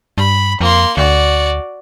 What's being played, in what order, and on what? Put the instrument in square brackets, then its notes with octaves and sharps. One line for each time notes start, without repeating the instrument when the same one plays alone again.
[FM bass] G2 [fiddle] B5
[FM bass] F2 [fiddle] A#3 C6
[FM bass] D2 [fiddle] F#4 D5